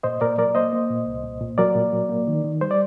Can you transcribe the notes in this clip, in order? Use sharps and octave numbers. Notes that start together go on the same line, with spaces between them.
A#2 C5 D#5
A#2 A#4 D5
F#3 A#4 D5
A#3 C5 D#5
A#3
A#2
C2
A#2
A#2
F#3 A#4 D5
A#2
F#3
A#3
D#3
D#3
G3 C5
D5